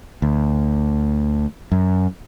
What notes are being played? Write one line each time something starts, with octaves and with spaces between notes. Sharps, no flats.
D2
F#2